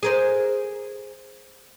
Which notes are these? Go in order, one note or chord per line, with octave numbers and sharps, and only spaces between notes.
G#4 A#4 C5